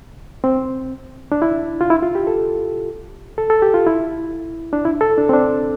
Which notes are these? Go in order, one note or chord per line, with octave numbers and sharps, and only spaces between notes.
C4
D4
E4
F4
E4
F4
G4
A4
A4
A4
G4
F4
E4
D4
E4
A4
D4
C4
D4